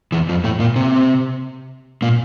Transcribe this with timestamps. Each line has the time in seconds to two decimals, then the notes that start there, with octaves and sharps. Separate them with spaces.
0.12 E2 E3
0.29 F2 F3
0.44 A2 A3
0.60 A#2 A#3
0.76 C3 C4
2.02 A#2 A#3